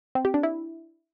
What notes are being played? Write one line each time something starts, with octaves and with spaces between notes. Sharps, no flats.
C4
G4
D4
E4